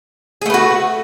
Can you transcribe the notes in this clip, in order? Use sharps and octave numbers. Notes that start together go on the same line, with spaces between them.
A3 F#4 G#4 B4